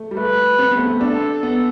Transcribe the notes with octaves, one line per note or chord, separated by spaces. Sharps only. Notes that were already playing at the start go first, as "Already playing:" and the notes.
Already playing: A3
G3
A3 B4
C4
B3
A3
B3
D4 A4
B3